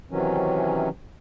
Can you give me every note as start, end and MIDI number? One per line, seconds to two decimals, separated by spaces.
0.11 0.88 48
0.11 0.88 51
0.11 0.88 52
0.11 0.88 54
0.11 0.88 61